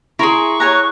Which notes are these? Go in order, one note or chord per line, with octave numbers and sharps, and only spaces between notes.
E4 G#4 A#4 A#5 C6 C#6
C#5 G#5 A#5 F#6